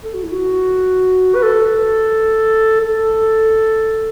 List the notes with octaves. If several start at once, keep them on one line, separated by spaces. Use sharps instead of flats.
A4
F#4
E4
F#4
B4
A4
A4